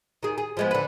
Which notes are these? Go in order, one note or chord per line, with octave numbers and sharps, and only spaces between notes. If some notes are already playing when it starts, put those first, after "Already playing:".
D#3 G#4
G#4
F3 G#3 B3
D3 B4